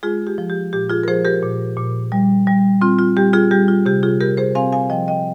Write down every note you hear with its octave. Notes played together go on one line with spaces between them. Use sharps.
G#3 F4 G#4
G4
F3
G4
A#2 G4
F4 G#4
A#4
F3 G#4 C5
G4 A#4
A#2
A#2
G3
G3
C4 F4
F4
G3 G4
F4 G#4
G3 G4
F4
C3 G4
F4 G#4
C3 G4 A#4
G#4 C5
C4 F5 G#5
F5 G#5
F3 D#5 G5
D#5 G5